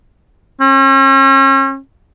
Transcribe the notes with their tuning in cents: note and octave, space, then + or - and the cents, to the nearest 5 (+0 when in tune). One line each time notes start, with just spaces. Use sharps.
C#4 -40